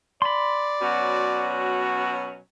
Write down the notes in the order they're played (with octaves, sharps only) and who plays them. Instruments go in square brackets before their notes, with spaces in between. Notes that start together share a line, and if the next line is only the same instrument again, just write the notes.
[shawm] D5 [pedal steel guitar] B5 C6
[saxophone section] B2 F#3 C#4 [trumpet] F#4